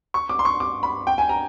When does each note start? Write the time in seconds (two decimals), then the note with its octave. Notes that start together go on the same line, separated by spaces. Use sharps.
0.14 C#6
0.29 D6
0.39 C6
0.45 C#6
0.60 D6
0.83 B5
1.07 G5
1.18 G#5
1.29 A#5